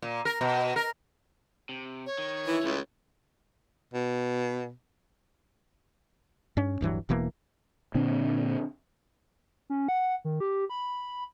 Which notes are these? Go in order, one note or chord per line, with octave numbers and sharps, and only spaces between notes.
A#2
A#4
B2
A#4
C3
C#5
D#3
E3 E4
C#2 E3 A3
B2
G2 C#4
D1 G2 E3 F#3
E1 B2 E3 A#3
A#2 D3 C4 D4
C#4
F#5
D#3
G4
B5